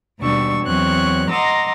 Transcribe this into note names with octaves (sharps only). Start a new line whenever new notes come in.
D#2 B2 G3 D4 C#6 E6
E2 F#3 C4 C#5 C#6 F#6
D#5 F#5 A#5 C6 D6 E6